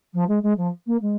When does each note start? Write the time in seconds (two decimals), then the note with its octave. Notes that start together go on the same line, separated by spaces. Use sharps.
0.14 F3
0.28 G#3
0.43 G#3
0.57 F3
0.87 A#3
1.01 G#3